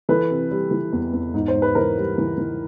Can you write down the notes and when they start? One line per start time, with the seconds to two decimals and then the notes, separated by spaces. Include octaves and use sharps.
0.09 E3 A4 B4
0.30 C3
0.51 G3
0.71 E3
0.93 E2
1.13 E2
1.34 G#2
1.48 C5
1.54 G#2
1.62 B4
1.75 E3 A#4 C5
1.97 G3
2.18 E3
2.38 E3